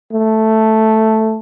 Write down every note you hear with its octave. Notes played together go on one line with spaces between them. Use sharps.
A3